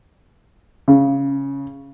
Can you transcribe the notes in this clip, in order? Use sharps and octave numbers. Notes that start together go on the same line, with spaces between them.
C#3